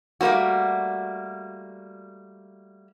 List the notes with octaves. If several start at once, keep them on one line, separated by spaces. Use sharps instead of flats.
G3 A3 A#3 C#4 F#4